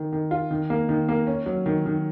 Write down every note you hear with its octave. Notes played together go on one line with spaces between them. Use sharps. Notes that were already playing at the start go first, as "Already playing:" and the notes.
Already playing: D#3
D#3
F4
D#3
A#3
D#3
A#3
C#4
F#3
D#3
D#3